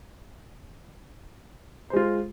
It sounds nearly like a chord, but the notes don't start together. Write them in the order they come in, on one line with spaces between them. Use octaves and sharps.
C5 G#3 F4